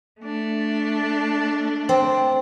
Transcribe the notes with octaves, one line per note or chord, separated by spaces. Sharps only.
A3 D4
C4